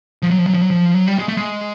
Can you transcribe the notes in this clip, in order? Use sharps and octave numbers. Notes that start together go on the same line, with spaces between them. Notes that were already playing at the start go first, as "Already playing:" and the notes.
F3
F#3
F3
F#3
F3
F#3
F3
F#3
G3
G#3
A3
G#3